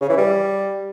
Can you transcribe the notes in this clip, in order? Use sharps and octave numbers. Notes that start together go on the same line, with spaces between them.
C#3
E3
G3